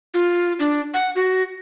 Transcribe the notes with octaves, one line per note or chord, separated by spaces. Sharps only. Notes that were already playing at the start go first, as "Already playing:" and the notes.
F4
D4
F#5
F#4